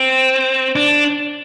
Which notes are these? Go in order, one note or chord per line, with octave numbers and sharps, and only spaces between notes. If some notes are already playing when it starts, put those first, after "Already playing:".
Already playing: C4
D4